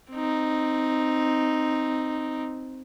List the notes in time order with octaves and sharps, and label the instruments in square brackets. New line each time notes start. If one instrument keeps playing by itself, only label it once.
[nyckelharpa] C4 D#4